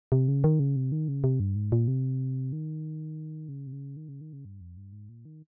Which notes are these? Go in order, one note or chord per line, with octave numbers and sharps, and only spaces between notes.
C3
C#3
D#3
C#3
C3
D#3
C#3
C3
G2
G#2
A#2
C3
D#3
C#3
C3
C#3
D#3
C#3
D#3
C#3
G2
F2
G2
G#2
A#2
D#3